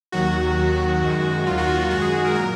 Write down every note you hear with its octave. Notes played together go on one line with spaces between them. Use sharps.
D#2 D#3 F#3 F#4
D#2 D#3 F#3
F#2 D#3 G#3
D#2 D#3 F#3 F4
F#4
F#4
F4
F#2 D#3 G#3 F#4
G#4
A#4
A#2 F#3 A#4